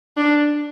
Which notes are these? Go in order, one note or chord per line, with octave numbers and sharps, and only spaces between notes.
D4